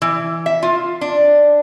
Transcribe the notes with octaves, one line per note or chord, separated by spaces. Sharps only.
E3
E5
F4
D4